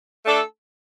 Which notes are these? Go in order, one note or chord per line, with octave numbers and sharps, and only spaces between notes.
A3 D4 A4 D5